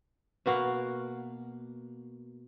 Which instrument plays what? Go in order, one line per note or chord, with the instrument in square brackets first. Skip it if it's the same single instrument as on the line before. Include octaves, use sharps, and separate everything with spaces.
[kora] B2 A#3 F#4 F5